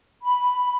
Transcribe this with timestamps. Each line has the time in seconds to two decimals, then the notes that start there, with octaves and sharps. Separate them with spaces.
0.22 B5